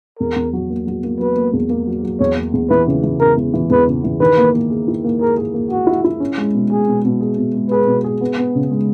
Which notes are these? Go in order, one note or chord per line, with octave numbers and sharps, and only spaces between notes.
E2 A#4
E2
F#3
A#3
F#3
A#3
F#3 B4
A#3
E2
A#3
F#3
F#3
E2 C#5
A#3
E2
E3 B4
C#3
E3
C#3 A#4
E2
E3
E2 B4
C#3
E3
D#3 B4
A#3
A#3
G#4
E4
A#3
G#4 A#4
G#4
A#3
F#4 G#4
E4
E4
C#4
G#3
B2
G#3 G#4
B2
B2
G#4
B2
G#3
G#4 B4
B2
G#4
B3
B3
C#3
G#3